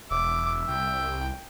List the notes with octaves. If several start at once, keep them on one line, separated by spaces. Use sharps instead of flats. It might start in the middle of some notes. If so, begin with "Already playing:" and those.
E1 E5 D6
C2 G5